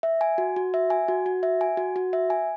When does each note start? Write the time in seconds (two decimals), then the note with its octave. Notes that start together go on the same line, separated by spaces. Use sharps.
0.03 E5
0.21 G#5
0.38 F#4
0.56 F#4
0.74 E5
0.90 G#5
1.08 F#4
1.26 F#4
1.43 E5
1.61 G#5
1.77 F#4
1.96 F#4
2.13 E5
2.30 G#5